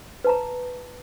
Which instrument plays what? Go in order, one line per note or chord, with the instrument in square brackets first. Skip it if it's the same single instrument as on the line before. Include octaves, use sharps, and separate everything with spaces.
[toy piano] B4 A5 A#5